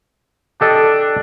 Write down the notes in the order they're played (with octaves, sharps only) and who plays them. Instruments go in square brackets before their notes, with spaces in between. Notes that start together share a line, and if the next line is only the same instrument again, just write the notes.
[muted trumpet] D4 [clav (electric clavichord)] G4 A4 D#5